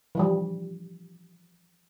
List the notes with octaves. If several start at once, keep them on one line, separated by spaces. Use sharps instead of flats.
E3 F3 G3